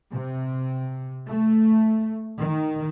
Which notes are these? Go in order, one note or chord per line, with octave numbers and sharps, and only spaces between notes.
C3
A3
D#3